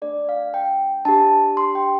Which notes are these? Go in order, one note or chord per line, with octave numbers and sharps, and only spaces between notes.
A3 D4 A4 D5
F5
G5
D4 G4 A5
C6
G5